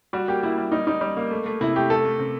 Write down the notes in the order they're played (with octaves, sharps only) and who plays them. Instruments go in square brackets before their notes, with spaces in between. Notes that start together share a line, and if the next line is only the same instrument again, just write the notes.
[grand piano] G3 [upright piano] F#4
[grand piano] A#3 [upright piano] G4
[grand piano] A#3 [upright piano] E4
[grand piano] G3
[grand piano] G3 [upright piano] D#4
[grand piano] G3 [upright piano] D#4
[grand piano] G3
A#3
A3
A3
[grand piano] C3 [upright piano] E4
[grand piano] A3 [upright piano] G4
[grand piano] A3 [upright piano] A4
[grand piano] A3
C3